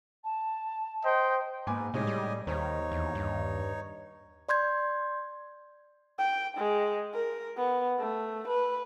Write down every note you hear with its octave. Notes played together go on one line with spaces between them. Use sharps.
A5
C5 D#5 G5
G#2 A#3 B4 G#5 D6
A2 C3 G#3 D#4 G4 C#5 D#5 G#5
G3
D#2 D#3 D#4 C5 C#5
E2
G2
D5 C6 G6 G#6
G5
G#3
A#4
B3
A3
B4